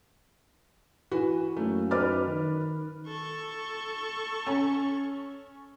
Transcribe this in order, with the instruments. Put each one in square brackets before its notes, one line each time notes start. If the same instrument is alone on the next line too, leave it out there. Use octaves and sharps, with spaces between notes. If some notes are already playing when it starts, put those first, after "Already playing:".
[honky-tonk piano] E3 [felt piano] F#4 B4
[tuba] F#2 [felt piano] A3 A#3
[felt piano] D#4 D6 A6 [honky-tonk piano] B4 F6
[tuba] D#3
[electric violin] A4 C#6
[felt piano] C#4